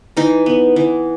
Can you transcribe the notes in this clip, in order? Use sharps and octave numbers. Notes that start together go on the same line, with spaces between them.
E3 D#4
B3
E3